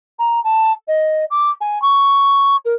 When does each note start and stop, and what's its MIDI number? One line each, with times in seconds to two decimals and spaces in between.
0.18 0.42 82
0.44 0.71 81
0.87 1.25 75
1.30 1.50 86
1.60 1.81 80
1.81 2.56 85
2.65 2.74 70